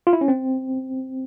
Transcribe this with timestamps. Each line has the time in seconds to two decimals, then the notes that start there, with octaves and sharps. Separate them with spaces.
0.07 F4
0.13 E4
0.21 C#4
0.28 C4